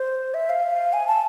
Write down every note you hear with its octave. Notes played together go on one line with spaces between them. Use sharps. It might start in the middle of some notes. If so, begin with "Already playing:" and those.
Already playing: C5
E5
F5
G#5
A5